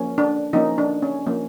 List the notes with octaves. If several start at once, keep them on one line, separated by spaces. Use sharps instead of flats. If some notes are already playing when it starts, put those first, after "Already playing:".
Already playing: F3 A#3 C#4
D4
F3 A#3 C#4 D#4
D4
C#4
F3 A#3 C#4